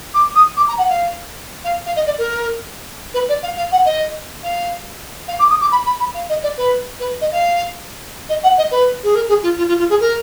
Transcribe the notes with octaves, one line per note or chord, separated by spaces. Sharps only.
D6
D#6
D6
A#5
F#5
F5
F5
F5
D#5
D5
A#4
B4
D5
F5
F5
F#5
D#5
F5
F5
D6
D#6
D6
B5
B5
B5
F5
D#5
D5
B4
B4
D#5
F5
D#5
F#5
D#5
B4
G#4
A#4
G#4
F4
F4
F4
F4
G#4
A#4